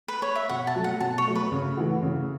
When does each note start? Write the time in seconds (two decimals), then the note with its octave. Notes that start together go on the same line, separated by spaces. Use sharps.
0.08 B4
0.22 C#5
0.35 E5
0.49 B2 F#5
0.67 A5
0.76 F#3 A3
0.84 F#5
1.00 B2 A5
1.18 C#5
1.26 F#3 A3
1.35 B4
1.52 C#3
1.77 E3 A3 F#4
2.02 C#3